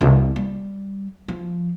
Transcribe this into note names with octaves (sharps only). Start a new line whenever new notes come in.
C2 C3
G3
F3